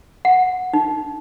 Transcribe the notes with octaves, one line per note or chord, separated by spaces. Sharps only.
F#5
D#4